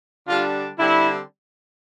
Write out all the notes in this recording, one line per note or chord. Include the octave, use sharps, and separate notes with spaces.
D3 G3 D4 F4
D3 G3 C4 E4